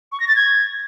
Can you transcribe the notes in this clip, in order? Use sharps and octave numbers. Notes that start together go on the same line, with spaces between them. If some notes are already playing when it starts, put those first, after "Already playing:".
C#6
A#6
A6
G#6